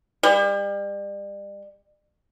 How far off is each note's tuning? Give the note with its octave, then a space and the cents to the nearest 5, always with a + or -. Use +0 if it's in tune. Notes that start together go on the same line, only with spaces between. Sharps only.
G3 +35